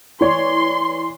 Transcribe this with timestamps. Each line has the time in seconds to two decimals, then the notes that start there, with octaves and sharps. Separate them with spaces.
0.21 E3 C#5 D5 C6